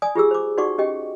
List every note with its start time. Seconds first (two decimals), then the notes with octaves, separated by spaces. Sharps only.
0.02 D5 G#5 D#6
0.15 F4 G4 G#4 E6
0.31 C5 D6
0.57 D#4 F#4 D5 F#5 C#6 D6
0.78 C#4 G4 D#5 G5